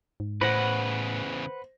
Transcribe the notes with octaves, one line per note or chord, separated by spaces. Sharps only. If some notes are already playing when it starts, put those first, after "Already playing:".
G#2
E2 A2 C#3 B4 C5 F#5 A#6